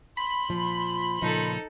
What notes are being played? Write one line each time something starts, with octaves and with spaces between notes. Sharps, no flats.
B5 C6
A#2 F3
A#2 C#3 F3 D#4 A4